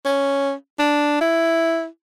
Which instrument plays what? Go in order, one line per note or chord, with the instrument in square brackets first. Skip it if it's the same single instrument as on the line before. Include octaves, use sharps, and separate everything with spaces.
[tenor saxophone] C#4
D4
E4